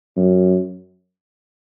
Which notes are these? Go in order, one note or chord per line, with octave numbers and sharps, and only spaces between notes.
F#2